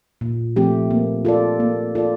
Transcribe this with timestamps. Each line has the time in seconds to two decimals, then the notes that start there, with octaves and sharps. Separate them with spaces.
0.21 A#2
0.56 F3 A3 C4 G4
0.91 A#3
1.25 F4 A4 D5
1.60 A#3
1.95 F4 A4 D5